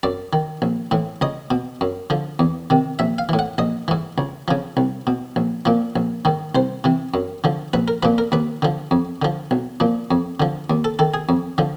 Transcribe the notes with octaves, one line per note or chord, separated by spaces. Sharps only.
F#2 D5
D#3
A#1
A2 E3
C#2 D#5
B2
F#2
D3 F3
E2
C3 D#3
A#1 E5
F5
A2 E3
F#5
A#1 D#5
G#2 E3
C#2
C#3 F3
C2
B2
A#1
A#2 F3
A#1
G#2 D#3
C2 C5
C3 E3
F#2
D3 F3
A#1 B4
A#4
A#2 F3 B4
A#4
D#2 B4
D3 F3
F2
D3 F3
B1
A#2 F3
F2
D3 F3
D#2
A4
D#3 A4
G#4
F2
D3 F3